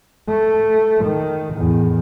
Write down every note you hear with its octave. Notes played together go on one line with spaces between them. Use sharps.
A3
D#3
E2 A2